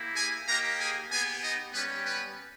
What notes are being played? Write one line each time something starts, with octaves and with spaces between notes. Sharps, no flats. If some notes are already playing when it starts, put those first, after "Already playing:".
Already playing: A#3 E4 G4
G#4 G#5
A#3 D#4 G4 A#4 A#5
G#4 G#5
B3 G4 G#4 G#5
D#4 D#5
G3 B3 C#4 G4 B4
B3 B4